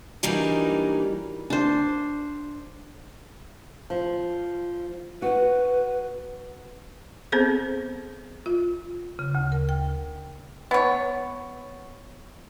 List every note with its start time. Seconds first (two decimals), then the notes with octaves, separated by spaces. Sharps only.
0.23 E3 F#3 G3 A#3 D4 D#4
1.50 D4 C5
3.90 F3
5.22 F#4 B4
7.32 B3 C4 G#4 A4 C5
8.46 F4
9.19 C#3
9.35 D2
9.52 A#4
9.69 G5
10.71 B3 C#5